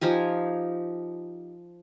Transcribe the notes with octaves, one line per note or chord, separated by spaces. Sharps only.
F3 D#4 G4 G#5